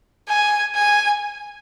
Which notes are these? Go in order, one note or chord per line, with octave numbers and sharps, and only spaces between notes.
G#5
G#5